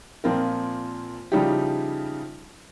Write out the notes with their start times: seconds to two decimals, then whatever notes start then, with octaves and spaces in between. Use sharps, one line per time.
0.24 A#2 F3 C4 F4 A#4
1.32 C#3 F3 G3 D#4 E4 G4